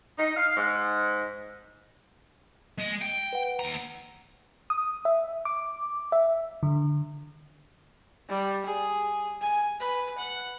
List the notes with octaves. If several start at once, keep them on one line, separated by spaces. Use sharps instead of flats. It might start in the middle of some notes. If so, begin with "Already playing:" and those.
D#4
F5
G#2
G#3 D#5
G5
B4 F#5
D#2 A#5
D#6
E5
D6
E5
D3
G3
G#4
G#5
B4
F#5